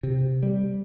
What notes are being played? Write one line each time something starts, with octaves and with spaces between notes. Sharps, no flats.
C3
G3